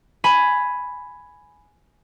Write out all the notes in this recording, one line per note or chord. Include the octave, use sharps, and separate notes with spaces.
G#5 B5